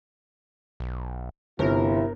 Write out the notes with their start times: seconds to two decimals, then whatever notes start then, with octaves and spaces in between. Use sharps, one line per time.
0.80 B1
1.59 G1 C3 E4 F4 A#4